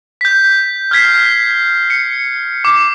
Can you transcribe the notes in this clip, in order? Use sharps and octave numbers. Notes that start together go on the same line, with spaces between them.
G6 B6
F6 G6 G#6 B6 C7
C#7
D6